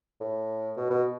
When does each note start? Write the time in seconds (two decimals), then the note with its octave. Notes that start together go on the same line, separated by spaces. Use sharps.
0.20 A2
0.77 B2
0.90 B2